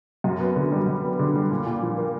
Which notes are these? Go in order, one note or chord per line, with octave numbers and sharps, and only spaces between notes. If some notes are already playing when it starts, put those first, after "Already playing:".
F#2
B3
D3
G3
F#2
B3
D3
G3
A#2
A#2
F3
A#3